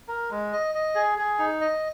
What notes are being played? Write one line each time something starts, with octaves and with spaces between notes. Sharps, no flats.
A#4
G#3
D#5
D#5
G#4
G#4
D#4
D#5